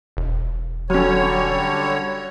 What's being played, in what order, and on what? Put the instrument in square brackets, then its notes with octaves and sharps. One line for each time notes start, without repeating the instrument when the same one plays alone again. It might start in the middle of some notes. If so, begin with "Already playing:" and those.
[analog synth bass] E1
[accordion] D3 G3 C#5 [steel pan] F#3 C#4